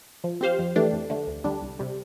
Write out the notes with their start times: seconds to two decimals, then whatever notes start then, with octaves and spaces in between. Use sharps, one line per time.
0.24 F3
0.41 C4 G4 C5 F5
0.59 F2
0.76 E3 A3 D4 G4
0.93 F2
1.10 D3 A3
1.27 D2
1.44 D3 G3 D4
1.62 C2
1.79 C3 G3